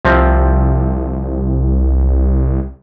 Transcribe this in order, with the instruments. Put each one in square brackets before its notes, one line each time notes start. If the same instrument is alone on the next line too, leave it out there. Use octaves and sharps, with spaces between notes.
[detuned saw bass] C2 [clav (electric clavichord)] C3 F3 C4